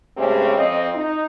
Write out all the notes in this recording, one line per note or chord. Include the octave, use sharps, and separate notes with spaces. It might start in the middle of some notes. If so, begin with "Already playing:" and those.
G2 C3 G#3 A3 C4 C#4
F2 C4 D#5
D#4